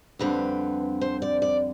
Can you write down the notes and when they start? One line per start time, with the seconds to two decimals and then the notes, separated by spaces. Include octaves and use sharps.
0.19 F2 D3 G3 C4 B4
1.01 C5
1.22 D5
1.42 D5